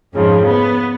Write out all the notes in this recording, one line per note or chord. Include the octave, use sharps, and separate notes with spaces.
F2 G#2 C#3 F3
B3